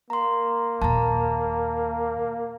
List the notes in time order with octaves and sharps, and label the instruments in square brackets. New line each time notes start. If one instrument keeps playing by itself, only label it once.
[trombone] A#3 [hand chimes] A#5 C6
[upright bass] D#2 A#2 [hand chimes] A5 A#5